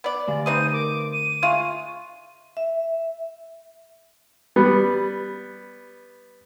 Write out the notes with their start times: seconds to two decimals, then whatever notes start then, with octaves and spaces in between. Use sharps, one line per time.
0.04 B3 D5
0.28 D3 A3 G#5 A6
0.46 B3 C4 D#4 D#6 G6 D#7
0.73 A#4 D6
1.12 D#7
1.43 G#3 F4 E5 F5 C#6
2.57 E5
4.56 G3 B3